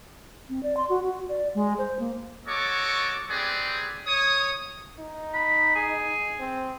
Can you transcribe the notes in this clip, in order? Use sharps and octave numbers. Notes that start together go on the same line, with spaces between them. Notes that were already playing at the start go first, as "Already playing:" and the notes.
C4
D5
C6
F#4
F#4
D5
G#3
C5
A#3
F#4 A4 C#5 D#5 C#6 D6
C4 D#4 G4 G#4 B4 D5
C#5 D#6
D#4
B5
G#4
C4